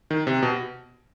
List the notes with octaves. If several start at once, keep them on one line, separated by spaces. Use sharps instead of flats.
D#3
C3
B2